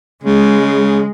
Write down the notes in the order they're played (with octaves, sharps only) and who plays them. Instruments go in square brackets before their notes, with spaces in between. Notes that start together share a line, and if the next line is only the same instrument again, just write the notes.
[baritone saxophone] C#3 [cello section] G#3